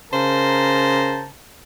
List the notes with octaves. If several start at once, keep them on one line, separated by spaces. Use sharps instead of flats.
C#3 A#4 C5 A5 A#5